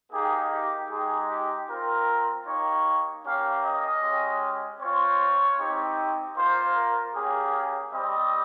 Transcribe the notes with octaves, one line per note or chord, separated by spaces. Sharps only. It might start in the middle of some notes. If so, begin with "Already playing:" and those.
A#3 D#4 G4 G#4
G4
G#3 D#4 G4 G#4
G4
C4 F4 A#4
A#3 D#4 G4 C#5
A#3 C#4 G4 F5
D#5
G#3 C#4 G4
C4 F4 C#5
C4 D#4 G4
A#3 F4 C5
A#4
A#3 C#4 G4 G#4
G3 C4 G4 D#5